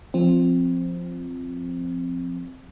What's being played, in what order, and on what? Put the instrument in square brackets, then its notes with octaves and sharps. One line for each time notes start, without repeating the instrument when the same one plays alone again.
[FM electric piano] F3 C4